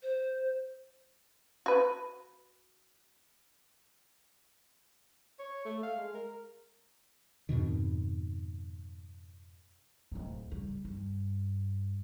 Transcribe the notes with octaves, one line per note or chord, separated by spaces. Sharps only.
C5
F#4 B4
C#5
A3
F5
G#3
A#4
F2 G#2 B2 D#3
D1 D#3
C#3 G3
G2